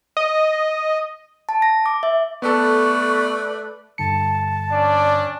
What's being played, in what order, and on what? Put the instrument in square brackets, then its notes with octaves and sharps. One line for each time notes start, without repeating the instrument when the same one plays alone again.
[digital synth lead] D#5
[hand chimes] A5
A#6
D6
E5
[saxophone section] A3 B4 D5 [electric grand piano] B3 A4 [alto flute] C#6
[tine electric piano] G2 D3 C#7 [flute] A5
[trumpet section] C#4 D4 D5